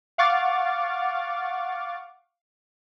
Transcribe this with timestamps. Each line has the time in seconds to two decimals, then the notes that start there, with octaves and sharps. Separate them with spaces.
0.18 F5 F#5 C#6 D6 F6 A6